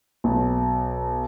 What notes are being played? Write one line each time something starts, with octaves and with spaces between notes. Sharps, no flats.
B1